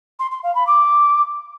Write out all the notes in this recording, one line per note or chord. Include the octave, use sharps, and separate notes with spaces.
C6
C6
F5
B5
D6